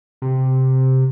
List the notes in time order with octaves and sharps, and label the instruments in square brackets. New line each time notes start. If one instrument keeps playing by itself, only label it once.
[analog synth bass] C3